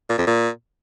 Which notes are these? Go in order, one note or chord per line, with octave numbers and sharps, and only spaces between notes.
A#2
F2
A#2